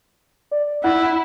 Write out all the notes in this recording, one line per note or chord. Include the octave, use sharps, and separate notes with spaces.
D5
E4 F#5 F#6